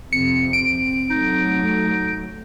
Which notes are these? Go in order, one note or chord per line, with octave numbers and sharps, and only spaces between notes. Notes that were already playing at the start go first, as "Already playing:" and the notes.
F2 C3 C4 C#7
D7
F#3 A3 D#4